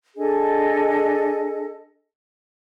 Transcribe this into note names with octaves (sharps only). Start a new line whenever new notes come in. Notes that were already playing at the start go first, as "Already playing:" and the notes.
D4 G#4 A4 D#5